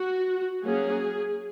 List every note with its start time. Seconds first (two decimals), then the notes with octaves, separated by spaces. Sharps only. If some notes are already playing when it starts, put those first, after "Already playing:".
Already playing: F#4
0.64 F#3 A#3 C#4 G#4